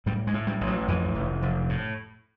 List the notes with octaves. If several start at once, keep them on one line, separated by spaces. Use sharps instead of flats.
A2 G3
G#3
A2
G3
A1
F#3
F2 E3
F1
F1
A2